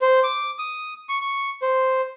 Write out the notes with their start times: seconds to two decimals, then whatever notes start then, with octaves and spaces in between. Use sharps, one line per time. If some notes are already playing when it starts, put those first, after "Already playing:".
0.01 C5
0.23 D6
0.59 D#6
1.09 C#6
1.21 C#6
1.62 C5